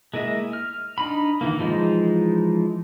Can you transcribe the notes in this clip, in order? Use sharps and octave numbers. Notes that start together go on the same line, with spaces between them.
G#3 A#3 E4 D#5 E5
F6
D4 D#4 B5
D#3 E3 A#3
E3 F3 G#3 D#4